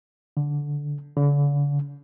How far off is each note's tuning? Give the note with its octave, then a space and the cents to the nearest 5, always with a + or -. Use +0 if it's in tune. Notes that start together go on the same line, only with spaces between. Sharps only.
D3 -10
D3 -40